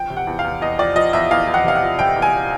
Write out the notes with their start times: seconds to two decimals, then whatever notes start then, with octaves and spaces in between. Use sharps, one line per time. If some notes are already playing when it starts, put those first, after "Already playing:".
Already playing: F3 G5
0.10 C3
0.17 F#5
0.27 E2
0.39 F5
0.44 E2
0.61 E2 D#5
0.78 F3 D5
0.96 F3 D#5
1.13 E2 E5
1.31 E2 F5
1.47 E2
1.54 F#5
1.64 C3 F5
1.76 F#5
1.82 F3
1.99 C3 G5
2.16 E2
2.22 G#5